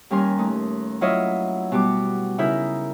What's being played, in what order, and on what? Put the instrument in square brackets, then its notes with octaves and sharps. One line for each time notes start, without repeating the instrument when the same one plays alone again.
[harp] D#2 G3 C#4 A#4 G#5 C6
A3 D#4
F#3 E4 F4 C#5 D#5 E5
B2 G3 F#4 D6
C#3 D#4 E4 A#4 E5 G6